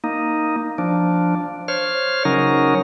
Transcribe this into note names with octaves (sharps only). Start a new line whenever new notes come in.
A#3 D#4
F3 D4
C5 C#5 F6
C#3 F#3 C#4 D#4 A#4